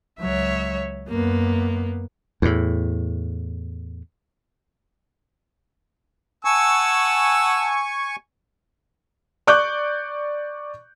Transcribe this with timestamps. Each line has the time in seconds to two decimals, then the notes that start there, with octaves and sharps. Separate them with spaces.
0.20 C#2 F#3 C#5 E5
1.08 F#2 A#3 B3
2.42 E2 A2
6.45 F#5 G#5 A5 C#6 E6
9.47 D5 C#6 D6 F#6 G6